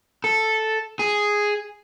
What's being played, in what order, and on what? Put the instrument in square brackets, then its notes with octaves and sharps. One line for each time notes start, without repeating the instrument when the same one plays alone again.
[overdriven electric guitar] A4
G#4